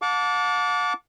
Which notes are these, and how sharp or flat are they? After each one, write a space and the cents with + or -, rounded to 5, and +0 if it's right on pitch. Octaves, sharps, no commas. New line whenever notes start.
F#5 -45 A5 +0 D6 -25